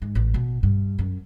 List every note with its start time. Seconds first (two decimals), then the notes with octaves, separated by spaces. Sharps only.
0.02 G#2
0.15 A1
0.34 B2
0.63 G2
0.99 F#2